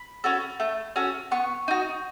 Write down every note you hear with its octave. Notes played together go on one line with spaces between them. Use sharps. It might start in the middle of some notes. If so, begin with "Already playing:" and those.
Already playing: B5
C#4 F#4 A4
A3
C#4 F#4 A4
B3 C#6
D#4 F#4